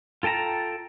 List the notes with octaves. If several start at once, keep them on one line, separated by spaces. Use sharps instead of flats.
F4 A4 G5 A5 A#5